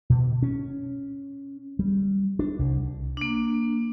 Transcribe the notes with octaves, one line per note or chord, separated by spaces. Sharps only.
B2
C#4
G3
D4
C2
A#3 D4